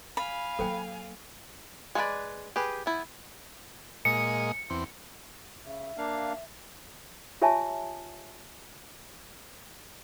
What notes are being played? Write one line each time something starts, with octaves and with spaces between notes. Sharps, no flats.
F5 G#5 B5
F#3 A#3 A4 C5 G5
G#3 F#4 A4 B4 D5
G4 G#4 B4
B3 E4
A#2 G#3 D#5 C#7
E2 C4
C#3 E5
A#3 D4 F5
F4 G4 C#5 E5 G#5 A5